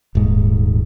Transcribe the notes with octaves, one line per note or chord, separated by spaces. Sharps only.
D#1 G#2